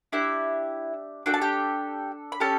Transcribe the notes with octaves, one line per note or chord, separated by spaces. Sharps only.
D4 E4 G4 E5
D4 F#4 A4 G5
A5
G4 G5
B5
C#4 G4 A4 A5